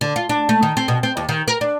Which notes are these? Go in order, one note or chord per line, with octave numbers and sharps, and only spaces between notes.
D3
F4
D4
A3
D#3
C4
B2
C4
D#2
D#3
A#4
D4